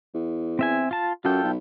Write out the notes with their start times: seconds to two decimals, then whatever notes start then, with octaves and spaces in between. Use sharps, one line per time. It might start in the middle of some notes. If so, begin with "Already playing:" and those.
0.15 E2
0.59 C4 E5 G#5
0.91 F4 A5
1.25 F#2 F4 A4 G5
1.43 B1